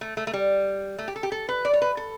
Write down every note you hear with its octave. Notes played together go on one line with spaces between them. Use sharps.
A3
A3
A3
G3
A3
G4
A4
G4
A4
B4
D5
C#5
B4
A4